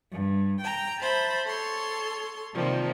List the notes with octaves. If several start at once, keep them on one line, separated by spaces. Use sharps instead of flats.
G2
G5 A#5
C5 E5 A5 B5
A4 C#5 C6
C3 D#3 F3 G3 A#3